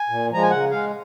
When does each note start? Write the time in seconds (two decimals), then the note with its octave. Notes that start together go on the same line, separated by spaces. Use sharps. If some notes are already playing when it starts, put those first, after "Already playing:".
Already playing: G#5
0.09 A#2
0.31 F3 G#3 A#5
0.42 G#5
0.50 C#3 F#5
0.71 G#3 F5